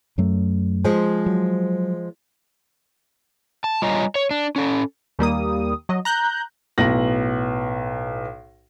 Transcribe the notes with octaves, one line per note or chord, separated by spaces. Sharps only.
F#2 F#3 A3
F3 G#3 C5
F#3
A5
G3 F4 C#5 D#5 G#5 A#5
C#5
D4
C#4 A4
D#2 G3 A#3 D#6
F#3 D#5
A#5 F#6 G6
B1 A2 B3 A#6 F#7